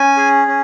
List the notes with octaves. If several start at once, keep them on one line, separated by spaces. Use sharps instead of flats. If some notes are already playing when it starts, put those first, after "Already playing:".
Already playing: C#4 G#5
G#4
C#4